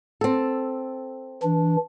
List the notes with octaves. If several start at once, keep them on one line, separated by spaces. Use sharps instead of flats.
C4 A4
E3 D4